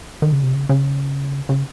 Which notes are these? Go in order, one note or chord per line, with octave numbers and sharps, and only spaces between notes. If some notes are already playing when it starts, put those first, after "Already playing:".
D#3
C#3
C3
C#3
C#3
C#3